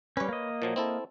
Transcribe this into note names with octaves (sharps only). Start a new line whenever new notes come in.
G3 C#4 B4 C#5
A#3 D#5
A#2 F3 F#3
C4 E4 A4